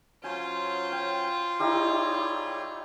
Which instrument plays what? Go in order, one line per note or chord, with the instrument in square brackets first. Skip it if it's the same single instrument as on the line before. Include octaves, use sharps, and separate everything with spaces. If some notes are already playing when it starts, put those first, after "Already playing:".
[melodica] F#3 C#4 C5 [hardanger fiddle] F4 [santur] G#5
[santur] G5
[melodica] G3 G#4 C#5 [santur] D#4 E4 G4